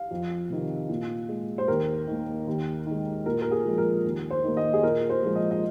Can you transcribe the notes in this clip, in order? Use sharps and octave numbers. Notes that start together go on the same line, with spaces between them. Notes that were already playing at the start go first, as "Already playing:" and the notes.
Already playing: F5
F2
C3 D#3
A#2
G#3
C5
D#2 A#4
D#3 A#3
D#2
D#3 G#3
A#2 A#4
A#4
G#4
F3 G#3
A#4
D#2
C5
D#3 A#3
D#5
G#4
A#2 A#4
C5
F3 G#3
D#5
D#5